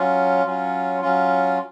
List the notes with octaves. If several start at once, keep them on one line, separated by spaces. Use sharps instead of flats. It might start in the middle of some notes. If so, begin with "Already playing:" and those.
Already playing: F#3 C#4 F4
F#3 C#4 F4
F#3 C#4 F4